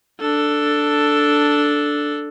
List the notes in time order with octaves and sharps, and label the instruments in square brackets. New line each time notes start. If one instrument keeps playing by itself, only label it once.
[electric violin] D4 A4